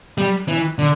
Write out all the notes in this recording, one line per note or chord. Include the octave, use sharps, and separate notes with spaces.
G3
E3
D3